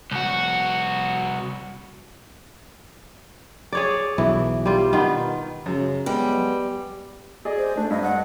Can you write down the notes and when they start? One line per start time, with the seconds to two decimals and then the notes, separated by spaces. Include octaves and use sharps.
0.11 C2 F#4
3.72 G#4 C#5 D5
4.18 B1 E3
4.66 G3 F4
4.93 D#3 B3 F4
5.66 F#2 C#3 F#3
6.06 G3 G#3 B3
7.45 G#4 D5 D#5
7.57 C5
7.77 A3 D4
7.91 G2 D#5
8.03 F#5